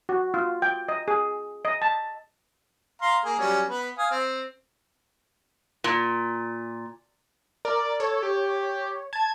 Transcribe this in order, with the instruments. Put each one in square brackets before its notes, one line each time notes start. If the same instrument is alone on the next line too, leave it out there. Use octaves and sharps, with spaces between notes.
[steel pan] F#4
F4
G5
D#5
G#4
D#5
A5
[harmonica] F5 A#5 C6
A#3 G#4
F#3 G3 C#4
B3 B4
F5 G#5 D#6
C4
[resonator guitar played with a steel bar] A#2
[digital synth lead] A#4 [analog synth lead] D5
[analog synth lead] A4 [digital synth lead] C#5
[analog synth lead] G4
[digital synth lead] A5 [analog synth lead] G#6